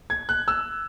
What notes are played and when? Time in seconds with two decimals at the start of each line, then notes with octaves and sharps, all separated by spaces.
0.10 G#6
0.29 F#6
0.48 E6